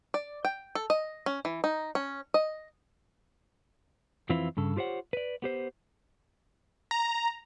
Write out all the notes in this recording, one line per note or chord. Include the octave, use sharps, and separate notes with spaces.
D5
G5
A4
D#5
C#4
E3
D#4
C#4
D#5
F2 E3 C4 E4 F4 B4
G2 C#3 A4
F4 G4 C5 C#5 F#5
B4 D5
B3 G4 C5
A#5